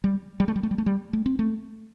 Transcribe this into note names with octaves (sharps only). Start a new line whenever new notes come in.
G3
G3
A3
G3
A3
G3
A3
G3
A3
C4
A3